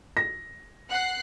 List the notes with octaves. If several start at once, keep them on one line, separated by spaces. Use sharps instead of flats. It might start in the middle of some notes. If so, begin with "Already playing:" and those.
A#6
F#5 F#6 C7